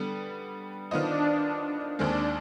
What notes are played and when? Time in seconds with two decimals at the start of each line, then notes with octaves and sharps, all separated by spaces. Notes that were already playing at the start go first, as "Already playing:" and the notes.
Already playing: D3 G3 B3
0.91 D#3 B3 D4 F4 C5 D#5
1.99 D#2 D#3 G#3 C4 D4